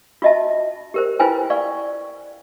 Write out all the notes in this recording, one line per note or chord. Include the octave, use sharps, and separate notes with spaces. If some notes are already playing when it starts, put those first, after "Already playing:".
F4 F#4 D#5 E5 A5
G4 A#4 C5
E4 F4 B4 C5 G5 G#5
D5 F5 C#6